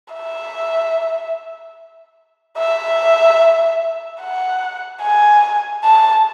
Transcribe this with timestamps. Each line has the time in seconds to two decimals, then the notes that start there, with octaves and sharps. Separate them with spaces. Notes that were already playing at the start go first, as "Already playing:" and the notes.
0.14 E5
2.58 E5
4.21 F#5
5.01 G#5
5.84 A5